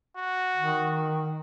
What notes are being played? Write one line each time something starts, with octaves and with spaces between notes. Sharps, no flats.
F#4
D#3